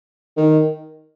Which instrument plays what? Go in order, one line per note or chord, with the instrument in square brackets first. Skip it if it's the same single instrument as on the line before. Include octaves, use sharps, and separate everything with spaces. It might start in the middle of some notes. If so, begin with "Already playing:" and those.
[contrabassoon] D#3